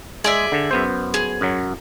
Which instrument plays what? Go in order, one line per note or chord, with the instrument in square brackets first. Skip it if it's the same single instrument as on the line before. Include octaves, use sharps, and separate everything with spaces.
[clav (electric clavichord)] G#3 [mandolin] G#4 D5 E5
[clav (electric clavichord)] D3
F#2 B3 C5
[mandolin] G#4
[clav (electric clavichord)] F#2 F#3